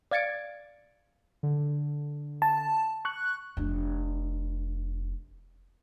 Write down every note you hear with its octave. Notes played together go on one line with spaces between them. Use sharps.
D5 F5 G#6 A6 C#7 D7
D3
A5
C#6 F#6
F1 D4